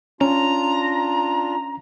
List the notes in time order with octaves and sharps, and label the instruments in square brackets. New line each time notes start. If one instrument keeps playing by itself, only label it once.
[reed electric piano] C#4 [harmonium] D4 F4 [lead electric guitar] A#5